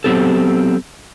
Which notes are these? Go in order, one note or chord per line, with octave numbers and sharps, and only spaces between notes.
F#3 B3 C4 G4 A4